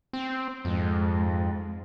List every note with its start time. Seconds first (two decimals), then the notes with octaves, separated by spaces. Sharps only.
0.13 C4
0.65 F2 G#2